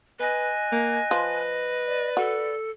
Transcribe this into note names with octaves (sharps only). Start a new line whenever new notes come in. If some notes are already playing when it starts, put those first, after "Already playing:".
B4 D#5 G#5 F#6
A#3
F3 B4
D5
F#4 A4